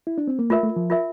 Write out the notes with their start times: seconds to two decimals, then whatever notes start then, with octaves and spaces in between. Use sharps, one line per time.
0.07 E4
0.18 D4
0.28 C4
0.39 A#3
0.50 A3 F4 A#4 E5
0.63 A3
0.76 F3
0.90 F4 A#4 E5